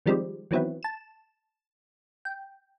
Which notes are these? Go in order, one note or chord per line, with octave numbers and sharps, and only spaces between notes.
D#3 F3 G3 G#3 C4
D#3 E3 F#3 B3 C4 E4
A5 E7
G5